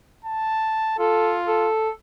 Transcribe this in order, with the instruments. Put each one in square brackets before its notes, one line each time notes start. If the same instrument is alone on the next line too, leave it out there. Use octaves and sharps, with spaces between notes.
[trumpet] A5
[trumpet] F4 [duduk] A4
[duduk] A4